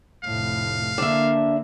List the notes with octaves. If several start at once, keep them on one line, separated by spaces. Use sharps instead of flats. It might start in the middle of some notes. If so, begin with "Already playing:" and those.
F1 A2 F5
D3 A#3 D4 E5